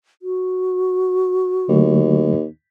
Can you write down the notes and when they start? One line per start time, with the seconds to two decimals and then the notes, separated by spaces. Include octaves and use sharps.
0.22 F#4
1.68 D#2 D3 F#3 A3